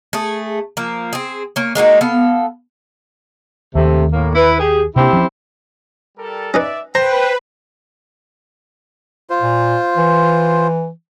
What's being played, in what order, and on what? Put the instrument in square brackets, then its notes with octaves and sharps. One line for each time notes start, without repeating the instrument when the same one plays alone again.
[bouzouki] A3 G#4
F3 A#3
C4 G#4
A#3 C#4
G#3 A#3 D#4 F#4
B3 A4 F5
[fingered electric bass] D#2 [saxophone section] C3 A3
[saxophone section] A2 A#3
E4 B4
G4 G#4
[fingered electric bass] C3 A#3 D4 [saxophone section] C4 E4 G4
[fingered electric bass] F3 C#4
[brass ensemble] G3 A4 A#4
[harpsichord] C#4 D#4 B4 [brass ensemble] D5 E5
[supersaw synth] B4 [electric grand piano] C5 [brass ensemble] G5 [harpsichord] A#5
[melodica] F4 C5
[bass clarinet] A#2
E3